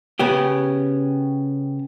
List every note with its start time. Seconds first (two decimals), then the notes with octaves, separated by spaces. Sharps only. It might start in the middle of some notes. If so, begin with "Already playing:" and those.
0.19 C#3 B3 C#4 G4